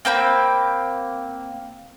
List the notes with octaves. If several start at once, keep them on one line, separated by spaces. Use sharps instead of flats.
A#3 C4 G5 B5